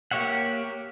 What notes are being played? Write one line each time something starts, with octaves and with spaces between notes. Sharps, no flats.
A#3 G4 C#5 E5 F#5